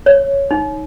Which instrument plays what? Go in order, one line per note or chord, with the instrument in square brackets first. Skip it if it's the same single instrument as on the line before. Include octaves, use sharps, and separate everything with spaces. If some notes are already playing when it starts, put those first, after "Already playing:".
[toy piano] C#5
D#4